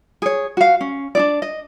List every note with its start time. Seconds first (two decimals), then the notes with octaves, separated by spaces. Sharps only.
0.22 G#4 C#5
0.57 F#4 F5
0.81 C#4
1.15 D4 D#4 D5
1.42 D#5